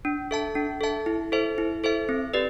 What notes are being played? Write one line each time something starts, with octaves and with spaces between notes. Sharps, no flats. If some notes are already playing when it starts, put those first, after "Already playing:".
D4
A4 E5 A5
D4
A4 E5 A5
E4
A4 C5 E5
E4
A4 C5 E5
C4
G4 B4 D5